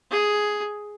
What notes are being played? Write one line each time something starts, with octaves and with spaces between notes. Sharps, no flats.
G#4